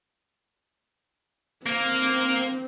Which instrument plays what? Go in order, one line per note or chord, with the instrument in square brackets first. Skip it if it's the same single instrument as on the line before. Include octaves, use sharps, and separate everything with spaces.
[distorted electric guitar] A#3 [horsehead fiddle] C4